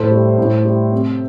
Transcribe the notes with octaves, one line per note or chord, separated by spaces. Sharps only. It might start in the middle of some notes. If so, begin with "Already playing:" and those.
Already playing: A2 A4 C5
G3
A2
G3
C3